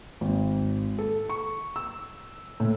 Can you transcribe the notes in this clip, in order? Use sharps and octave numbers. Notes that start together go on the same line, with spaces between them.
G#1
A4
C#6
E6
A2